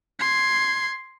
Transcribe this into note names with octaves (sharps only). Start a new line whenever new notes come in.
C6 G#6